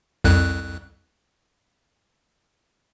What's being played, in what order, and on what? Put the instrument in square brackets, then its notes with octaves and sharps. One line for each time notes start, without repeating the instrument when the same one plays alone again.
[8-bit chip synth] C2 F2 F#6